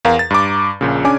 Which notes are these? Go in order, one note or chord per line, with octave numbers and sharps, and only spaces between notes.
E2 A#4 F5 A#5
A6
G2 A#5 D6
A#1 A#2 C#3
C#3 C#4 D4 G#5 D6